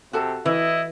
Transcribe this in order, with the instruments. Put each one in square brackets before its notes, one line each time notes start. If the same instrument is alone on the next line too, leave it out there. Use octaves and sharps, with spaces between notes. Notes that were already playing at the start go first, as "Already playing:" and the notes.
[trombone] C3 [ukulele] F#4 A4 A5
[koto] E3 [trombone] E4 [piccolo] D#5